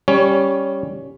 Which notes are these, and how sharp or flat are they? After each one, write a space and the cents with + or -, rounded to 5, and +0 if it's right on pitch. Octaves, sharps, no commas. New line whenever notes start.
G3 +0 C#4 +0 C#5 +20